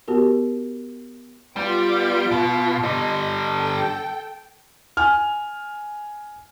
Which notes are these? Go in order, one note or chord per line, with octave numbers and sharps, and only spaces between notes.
B3 F#4 G4 A#4
G3 B3 F4 D7
B2
D3 G3 D#5
A4 G5
G#5 F6